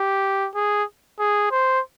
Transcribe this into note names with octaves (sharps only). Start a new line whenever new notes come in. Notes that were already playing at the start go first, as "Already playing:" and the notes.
Already playing: G4
G#4
G#4
C5